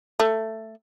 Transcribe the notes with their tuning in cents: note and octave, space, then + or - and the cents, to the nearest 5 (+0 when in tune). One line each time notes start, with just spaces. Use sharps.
A3 +10